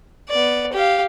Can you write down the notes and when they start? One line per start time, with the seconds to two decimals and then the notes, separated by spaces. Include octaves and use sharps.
0.29 B3 D5
0.73 G4 F5